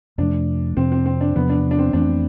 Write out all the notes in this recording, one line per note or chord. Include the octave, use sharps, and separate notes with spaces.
F2 C3 F3 A3 D4
F2 C3 F3 C4
C4
C4
D4
E2 C3 F3 B3
D4
D4
C4
F2 E3 A3 C4 D4